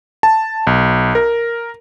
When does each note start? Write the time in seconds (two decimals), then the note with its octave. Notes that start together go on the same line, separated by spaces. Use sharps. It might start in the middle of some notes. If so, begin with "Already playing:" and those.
0.23 A5
0.67 B1
1.15 A#4